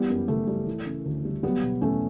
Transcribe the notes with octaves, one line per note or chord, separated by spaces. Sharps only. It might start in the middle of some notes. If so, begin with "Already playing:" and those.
Already playing: E3 G3 B3
F#2
F#1 A3
G3
E3
C#3
D2
G3
F#3 G3 B3
B2
E2 A3 C#4